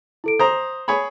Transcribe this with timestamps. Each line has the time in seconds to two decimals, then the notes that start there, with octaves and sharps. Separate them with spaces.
0.24 E4 A4 D7
0.39 C5 A#5 D#6
0.88 G#4 C#5 B5